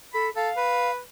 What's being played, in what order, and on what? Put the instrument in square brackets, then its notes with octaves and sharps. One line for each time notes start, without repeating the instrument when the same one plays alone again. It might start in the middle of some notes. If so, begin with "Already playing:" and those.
[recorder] A4 [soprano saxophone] B5
[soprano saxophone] A4 [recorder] F5
[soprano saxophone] B4